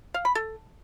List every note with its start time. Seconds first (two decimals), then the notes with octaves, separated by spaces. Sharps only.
0.14 F5
0.25 B5
0.35 A4